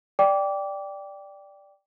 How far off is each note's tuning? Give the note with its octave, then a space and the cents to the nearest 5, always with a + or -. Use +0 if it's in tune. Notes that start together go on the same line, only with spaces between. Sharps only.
D5 +0 G5 +0 D6 -20